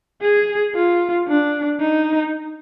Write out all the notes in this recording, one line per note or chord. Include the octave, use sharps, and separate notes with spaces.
G#4
F4
D4
D#4